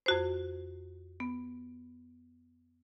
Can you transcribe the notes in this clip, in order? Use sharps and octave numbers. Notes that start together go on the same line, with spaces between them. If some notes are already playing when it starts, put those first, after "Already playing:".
F2 F#4 C5
B3